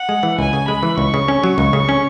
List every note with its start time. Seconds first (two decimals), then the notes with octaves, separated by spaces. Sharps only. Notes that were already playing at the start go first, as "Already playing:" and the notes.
Already playing: F#5
0.09 G#3
0.23 E3
0.39 C#2 G#5
0.53 C#3
0.68 G#3 B5
0.83 E3
0.98 C#2 C#6
1.14 C#3
1.28 C#4
1.44 F#3
1.58 C#2 C#6
1.73 C#3
1.89 C#4